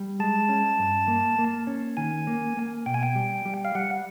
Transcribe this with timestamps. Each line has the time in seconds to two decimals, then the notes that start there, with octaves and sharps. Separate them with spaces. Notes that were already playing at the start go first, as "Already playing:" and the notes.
Already playing: G3
0.19 G#3 A5
0.49 C#4
0.79 G2
1.08 A#3
1.39 A#3
1.67 C#4
1.97 D#3 G#5
2.27 A#3
2.57 A#3
2.86 B2 G5
2.94 G#5
3.03 G5
3.15 G3
3.45 G3
3.65 F5
3.75 G3 F#5